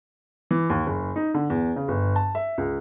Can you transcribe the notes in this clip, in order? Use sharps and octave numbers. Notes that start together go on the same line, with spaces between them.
E3
D#2
F#1
D#4
D3
E2
C#3
G1
A5
E5
C#2